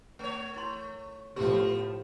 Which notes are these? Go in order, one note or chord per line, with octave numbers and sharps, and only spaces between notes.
A3 C#5
E4 C6
A2 F3 A3 B3 G4